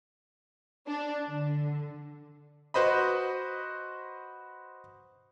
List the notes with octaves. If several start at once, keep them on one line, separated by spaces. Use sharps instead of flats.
D4
D3
F#4 B4 C5 D#5 B5